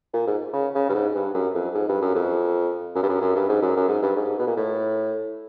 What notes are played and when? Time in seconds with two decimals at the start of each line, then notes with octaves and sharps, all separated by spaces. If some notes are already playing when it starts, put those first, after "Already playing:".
0.14 A#2
0.28 G#2
0.54 C#3
0.75 C#3
0.89 G2
0.95 G#2
1.15 G2
1.34 F#2
1.55 F2
1.75 G#2
1.89 G2
2.02 F#2
2.15 F2
2.96 F#2
3.03 G2
3.09 F#2
3.22 F#2
3.36 G2
3.49 G#2
3.63 F#2
3.76 F#2
3.89 G#2
4.03 G2
4.16 G#2
4.39 B2
4.47 A#2
4.57 A2